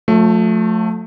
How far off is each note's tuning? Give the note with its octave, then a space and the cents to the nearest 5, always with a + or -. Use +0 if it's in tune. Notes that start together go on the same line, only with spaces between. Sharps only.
F3 +45 A3 +0